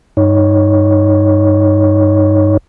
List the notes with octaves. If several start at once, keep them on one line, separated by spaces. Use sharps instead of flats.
G2 D#4 C#5